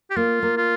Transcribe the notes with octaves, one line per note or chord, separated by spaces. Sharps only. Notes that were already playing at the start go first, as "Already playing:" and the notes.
G4
A#3 F4
A#3
F4